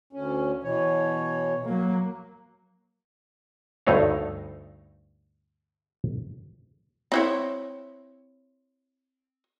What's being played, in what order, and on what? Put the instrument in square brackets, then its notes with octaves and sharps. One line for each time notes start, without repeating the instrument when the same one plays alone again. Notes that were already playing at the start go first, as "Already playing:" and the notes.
[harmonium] D2 C#4
B2 E3 C#5
[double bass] F#3 A#3
[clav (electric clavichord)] D2 G2 A3 D#4 C#5 F5
[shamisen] C4 E4 C#5